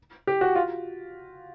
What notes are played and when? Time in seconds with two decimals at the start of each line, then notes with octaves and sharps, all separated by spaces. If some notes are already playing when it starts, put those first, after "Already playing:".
0.27 G4
0.41 F#4
0.56 F4